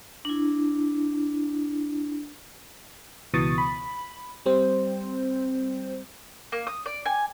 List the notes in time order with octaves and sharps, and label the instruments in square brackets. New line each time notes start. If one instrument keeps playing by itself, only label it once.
[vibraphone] D4 E4
[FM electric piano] C#2 B2 E3 C#6 D#6 A6
B5
G3 C4 C5
[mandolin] A#3
D#6
D5
G#5